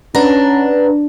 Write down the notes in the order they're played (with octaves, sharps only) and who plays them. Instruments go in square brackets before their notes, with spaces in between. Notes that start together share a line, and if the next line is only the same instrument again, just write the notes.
[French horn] C#4 [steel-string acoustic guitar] D4 [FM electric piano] B4 F#5 A#5